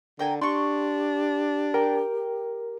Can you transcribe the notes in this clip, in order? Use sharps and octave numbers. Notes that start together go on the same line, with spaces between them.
D3 A#4 G5 G#5
D4 G4 C6 C#6
A#4 G5